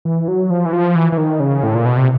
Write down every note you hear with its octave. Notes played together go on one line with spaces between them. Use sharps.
E3
F#3
F3
E3
F3
E3
E3
D#3
C#3
A2
A#2
B2
C3